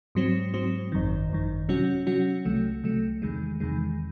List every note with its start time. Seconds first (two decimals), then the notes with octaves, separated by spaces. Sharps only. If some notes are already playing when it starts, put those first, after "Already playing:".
0.15 G#2 F#3 C4
0.54 G#2 F#3 C4
0.92 G#1 F#2 D#3
1.30 G#1 F#2 D#3
1.69 C3 F#3 C#4 F#4
2.07 C3 F#3 C#4 F#4
2.45 C2 C3 F#3 A3
2.84 C2 C3 F#3 A3
3.22 E2 C3 D#3 G#3
3.60 E2 C3 D#3 G#3